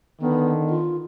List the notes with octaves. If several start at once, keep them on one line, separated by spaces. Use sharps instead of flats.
D3 D#3 B3
F4